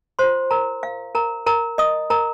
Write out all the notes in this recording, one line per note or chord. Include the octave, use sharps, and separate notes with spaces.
F4 C5 C6
A#4 A#5
F5
A#4 A#5
A#4 A#5
D#5 D#6
A#4 A#5